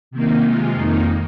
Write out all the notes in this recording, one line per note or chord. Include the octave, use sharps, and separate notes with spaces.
C3 D#3 A#3 D#4
C3 G#3 F4
F2 D#3 A#3 D#4